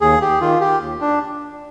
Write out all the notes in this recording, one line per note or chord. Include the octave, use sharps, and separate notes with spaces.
D#2 G#4
G4
D#3 F4
G4
D#2
D4